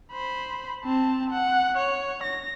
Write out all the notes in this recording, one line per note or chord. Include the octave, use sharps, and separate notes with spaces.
C5 B5
C4 A5
F#5
C#5
A#6